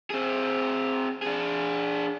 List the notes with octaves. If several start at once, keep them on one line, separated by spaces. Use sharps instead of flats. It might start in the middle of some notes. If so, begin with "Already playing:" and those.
C4 G#4
D4 G#4